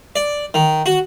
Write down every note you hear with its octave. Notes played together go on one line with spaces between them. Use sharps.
D5
D#3
F#4